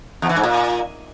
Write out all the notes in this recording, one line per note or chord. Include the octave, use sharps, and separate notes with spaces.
E2
E3
G#2
A#2